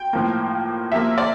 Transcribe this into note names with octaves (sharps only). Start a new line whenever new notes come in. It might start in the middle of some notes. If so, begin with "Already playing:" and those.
Already playing: G5
A2 F3 A#3
C3 F3 A#3 E5
D5